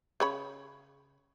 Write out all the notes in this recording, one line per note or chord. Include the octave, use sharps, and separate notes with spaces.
C#3 C#5 B5